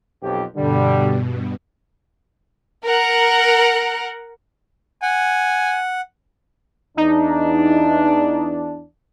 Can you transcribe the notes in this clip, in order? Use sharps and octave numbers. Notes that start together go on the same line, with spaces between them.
B1 F2 G4
G2 B2 D3 G3
A#4 F#5
F#5 G#5
E2 D4 D#4